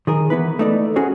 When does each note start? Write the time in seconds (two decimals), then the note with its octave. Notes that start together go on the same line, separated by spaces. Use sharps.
0.07 D#3 G#4 A#4
0.30 E3 B3 E4 B4
0.59 A3 D#4 D5
0.96 C#4 F#4 G#4 C5 C#5